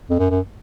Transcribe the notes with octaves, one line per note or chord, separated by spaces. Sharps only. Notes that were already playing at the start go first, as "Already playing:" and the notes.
F2
F#2
F#2